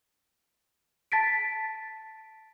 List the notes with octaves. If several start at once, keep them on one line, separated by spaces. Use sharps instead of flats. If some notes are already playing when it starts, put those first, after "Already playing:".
A5 A6 B6 D7